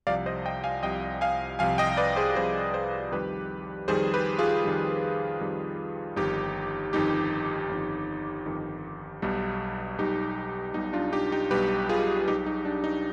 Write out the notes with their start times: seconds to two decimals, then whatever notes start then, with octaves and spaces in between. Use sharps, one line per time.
0.07 C2 C3 F3 D5 F5
0.26 C5 D#5
0.46 D#5 G5
0.64 F5 G#5
0.83 C2 C3 F3 D#5 G5
1.21 F5 G#5
1.59 C2 C3 F3 F5 G#5
1.78 D#5 G5
1.97 B4 D5
2.16 G#4 C5
2.35 C2 C3 F3 G#4 C5
2.74 G#4 C5
3.11 F2 D#3 G3 G4 B4
3.88 F2 D#3 G3 G#4 C5
4.14 G4 B4
4.39 F4 G#4
4.64 F2 D#3 G3
5.41 F2 D#3 G3
6.16 G1 F2 D#3 D#4 G4
6.93 G1 F2 D#3 D#4 G4
7.69 G1 F2 D#3
8.46 G1 F2 D#3
9.22 B1 B2 G3
9.98 B1 B2 G3 D#4 G4
10.74 B1 B2 G3 D#4
10.93 D4 F4
11.12 D#4 G4
11.32 D#4 G4
11.51 B1 B2 G3 G4 B4
11.89 F4 G#4
12.28 B1 B2 G3 D#4 G4
12.46 D#4
12.65 D4
12.84 D#4